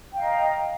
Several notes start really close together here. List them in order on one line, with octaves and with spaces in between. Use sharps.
G5 F5 D#5 A#5